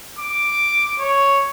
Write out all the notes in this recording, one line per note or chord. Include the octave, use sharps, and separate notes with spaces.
D6
C#5